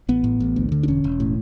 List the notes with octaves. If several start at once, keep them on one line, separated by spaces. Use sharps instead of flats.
A1 B3
A2
A1
D2
D3
D4
E1 C#4
E1
A2